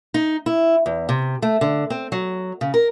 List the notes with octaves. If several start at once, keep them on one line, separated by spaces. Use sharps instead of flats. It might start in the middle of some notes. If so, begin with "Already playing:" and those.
D#4
E4
E2
C3
A3
D3
C4
F#3
C#3
A#4